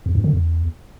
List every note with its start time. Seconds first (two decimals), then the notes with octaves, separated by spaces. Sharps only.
0.06 E2
0.15 G2
0.24 D3
0.33 E2